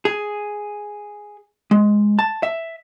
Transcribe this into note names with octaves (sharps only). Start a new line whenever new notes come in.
G#4
G#3
A5
E5